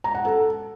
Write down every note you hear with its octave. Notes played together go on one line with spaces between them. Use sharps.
A#5
F#5
A4